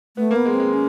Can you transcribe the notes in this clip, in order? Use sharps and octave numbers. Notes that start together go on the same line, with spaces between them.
A3 B3
A#3
B3
G#3
C4
G#3
C#4